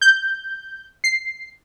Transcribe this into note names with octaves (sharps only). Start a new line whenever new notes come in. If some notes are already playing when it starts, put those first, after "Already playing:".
G6
C7